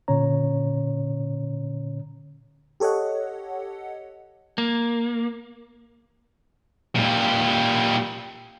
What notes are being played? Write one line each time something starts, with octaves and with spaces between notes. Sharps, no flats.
A#2 D3 C#4 C#5 A#5
G4 A4 C#5 D#5 F#5
A#3
A#2 G3